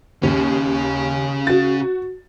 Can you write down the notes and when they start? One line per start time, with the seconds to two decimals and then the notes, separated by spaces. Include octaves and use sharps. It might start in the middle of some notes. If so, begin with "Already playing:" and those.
0.23 D#2 C#3 C#4
1.47 F#4 A6